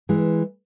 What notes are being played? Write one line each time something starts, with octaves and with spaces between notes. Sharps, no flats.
E3 G#3